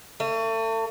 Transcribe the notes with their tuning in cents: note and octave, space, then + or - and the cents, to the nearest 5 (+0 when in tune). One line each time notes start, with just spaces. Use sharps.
A3 +35